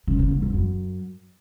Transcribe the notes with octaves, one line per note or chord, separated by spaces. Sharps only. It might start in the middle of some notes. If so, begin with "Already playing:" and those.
C#3
C#3
G#2
E2
F#2